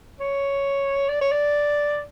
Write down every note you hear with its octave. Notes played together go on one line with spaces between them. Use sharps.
C#5
D5
C#5
D5